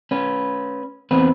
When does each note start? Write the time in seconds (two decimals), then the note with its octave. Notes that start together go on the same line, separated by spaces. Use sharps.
0.11 C#4 B4
1.11 E2 C4 B4